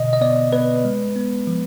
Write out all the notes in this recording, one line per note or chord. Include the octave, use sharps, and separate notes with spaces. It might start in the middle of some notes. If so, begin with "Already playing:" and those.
Already playing: B2 D3 D#5
D#5
B3 D5
B3 B4
G#3
B3
F3